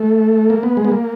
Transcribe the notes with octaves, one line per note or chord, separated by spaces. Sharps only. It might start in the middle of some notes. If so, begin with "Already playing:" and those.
Already playing: A3
A#3
B3
G#3
B3
A#3